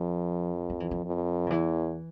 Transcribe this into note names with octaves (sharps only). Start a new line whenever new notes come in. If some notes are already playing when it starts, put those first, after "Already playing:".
Already playing: F2 F3
F3
E3
F3
F2
C#3
E2 E3